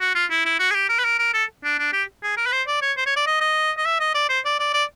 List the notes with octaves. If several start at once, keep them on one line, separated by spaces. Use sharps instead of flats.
F#4
F4
E4
E4
F#4
G#4
G4
A#4
B4
A#4
A#4
A4
D4
D4
G4
G#4
A#4
B4
C5
D5
C#5
C5
C#5
D5
D#5
D#5
D#5
E5
D#5
D5
C5
D5
D5
D5